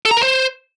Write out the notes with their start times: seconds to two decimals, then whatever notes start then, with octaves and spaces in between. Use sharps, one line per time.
0.05 A4
0.11 A#5
0.17 A#4
0.23 C5